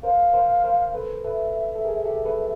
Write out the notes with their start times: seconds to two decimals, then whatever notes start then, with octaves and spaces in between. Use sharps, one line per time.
0.03 A#4 C5 F5
0.33 A#4 C5
0.64 A#4 C5
0.94 A4 B4
1.25 A4 B4 E5
1.75 A4
1.85 G#4 A#4
2.05 G4 A4
2.25 A4 B4